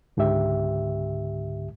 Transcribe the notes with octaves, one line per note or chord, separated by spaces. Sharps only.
C#2 G#2 D3 G4 E5